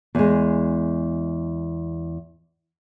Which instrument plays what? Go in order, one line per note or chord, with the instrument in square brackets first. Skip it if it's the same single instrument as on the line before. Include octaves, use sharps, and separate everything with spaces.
[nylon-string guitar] E2 G#3